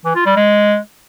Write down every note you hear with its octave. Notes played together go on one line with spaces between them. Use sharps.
E3
F4
G3
G#3